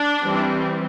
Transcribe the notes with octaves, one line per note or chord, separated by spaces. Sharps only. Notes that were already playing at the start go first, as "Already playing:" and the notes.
Already playing: D4
E3 G3 C4